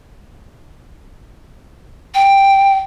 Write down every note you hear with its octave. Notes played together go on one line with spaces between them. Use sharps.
G5